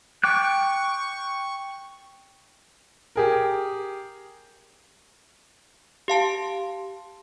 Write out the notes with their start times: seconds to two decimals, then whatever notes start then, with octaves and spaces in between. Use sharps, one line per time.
0.24 G5 C#6 D6 F#6
3.16 G4 G#4 A#4
6.08 G4 F5 A5